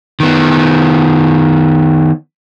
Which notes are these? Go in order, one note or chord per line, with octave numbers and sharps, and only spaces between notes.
D#3 B3